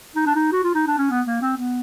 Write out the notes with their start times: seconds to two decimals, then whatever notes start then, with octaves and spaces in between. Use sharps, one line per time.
0.16 D#4
0.26 D4
0.35 D#4
0.52 F#4
0.64 F4
0.75 D#4
0.87 D4
0.98 C#4
1.10 B3
1.27 A#3
1.42 C4
1.57 B3